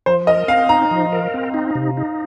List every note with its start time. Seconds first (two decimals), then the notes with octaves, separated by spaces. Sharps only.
0.06 F3 C5
0.27 A#4 D#5
0.48 C4 F5
0.69 D#4 A#5
0.91 F3
1.12 A#4
1.34 C4
1.54 D#4
1.75 C3
1.97 D#4